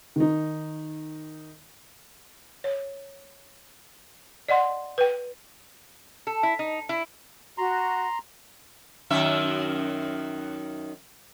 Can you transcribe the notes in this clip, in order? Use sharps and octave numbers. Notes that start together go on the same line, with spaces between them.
D#3 D#4
C#5
D5 D#5 F#5 C6
B4 G5
A4
E4
D#4
E4
F#4 A#5 C6
F#2 D#3 E5